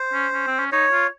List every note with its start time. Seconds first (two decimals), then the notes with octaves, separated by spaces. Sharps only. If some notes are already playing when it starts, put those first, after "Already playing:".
Already playing: C5
0.13 C#4
0.33 C#4
0.47 C4
0.59 C#4
0.72 D#4 C#5
0.92 F4